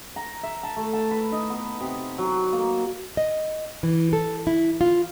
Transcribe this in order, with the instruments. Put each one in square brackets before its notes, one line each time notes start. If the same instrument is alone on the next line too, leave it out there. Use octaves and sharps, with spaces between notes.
[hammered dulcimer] A#5
E5
A5
A3
A5
B4
D#4
B3
C3
F#3
A#3
[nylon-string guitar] D#5
E3
A4
E4
F4